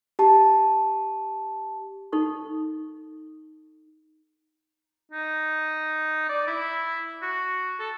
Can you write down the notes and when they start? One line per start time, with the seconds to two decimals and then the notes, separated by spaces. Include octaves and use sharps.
0.19 G4 A5
2.12 D#4 A4 C#6
5.12 D#4
6.29 D5
6.47 E4
7.22 F#4
7.79 A4